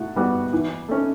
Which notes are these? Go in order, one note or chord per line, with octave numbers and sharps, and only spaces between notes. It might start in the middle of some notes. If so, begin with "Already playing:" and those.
Already playing: A2 F#4
G3 B3 F#4
E3
A3 C#4